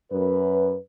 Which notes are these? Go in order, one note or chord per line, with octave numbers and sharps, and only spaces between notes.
F#2 B4